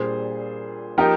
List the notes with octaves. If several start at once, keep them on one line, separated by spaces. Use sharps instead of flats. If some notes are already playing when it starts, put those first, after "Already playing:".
Already playing: A#2 G3 D4 G#4 C5
F3 A#3 D#4 G4 A#4